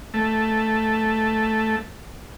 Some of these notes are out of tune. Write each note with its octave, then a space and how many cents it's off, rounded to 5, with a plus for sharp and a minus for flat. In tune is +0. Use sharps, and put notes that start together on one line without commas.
A3 +0